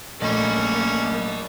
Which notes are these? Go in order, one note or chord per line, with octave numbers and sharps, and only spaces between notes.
A#1 A3 A#3 C#4 D5 D#5 B5